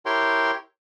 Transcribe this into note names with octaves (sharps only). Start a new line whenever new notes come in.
E4 G4 A#4 C#5 G5 C6